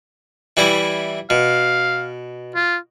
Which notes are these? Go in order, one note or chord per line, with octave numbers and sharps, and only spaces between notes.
E3 G3 E4
B2 F5
F4